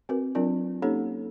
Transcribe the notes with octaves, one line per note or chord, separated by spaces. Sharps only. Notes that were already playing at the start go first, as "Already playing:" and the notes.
C4 F#4 A#4 B4
F#3 C4 D4 F4 A#4 D5
A#3 C#4 D#4 G4 A4 C#5